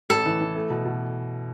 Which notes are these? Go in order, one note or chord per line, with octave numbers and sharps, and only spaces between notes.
A1 A4
E3
E3
A3
B2
B2